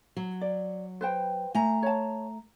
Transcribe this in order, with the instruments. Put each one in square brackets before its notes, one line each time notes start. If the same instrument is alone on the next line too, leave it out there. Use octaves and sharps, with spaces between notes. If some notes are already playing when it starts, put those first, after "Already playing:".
[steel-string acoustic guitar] F#3
[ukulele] D5
B4 C5 G5
[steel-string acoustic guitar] A3 A#5 [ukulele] G#5
[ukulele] C#5 A5